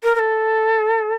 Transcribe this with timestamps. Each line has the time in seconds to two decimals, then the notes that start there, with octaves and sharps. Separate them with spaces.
0.03 A#4
0.15 A#4
0.19 A4